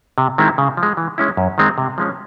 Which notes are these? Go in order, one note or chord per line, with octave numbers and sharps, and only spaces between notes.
C3
D#3 G#3 C4 E4
C#3
F3
G#3
E3
G#3 C#4 E4
F#2
D#3 G#3 C4
C3
F3 G#3 C#4